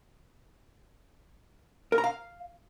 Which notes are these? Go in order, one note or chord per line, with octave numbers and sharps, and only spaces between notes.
A#4
A#5
F5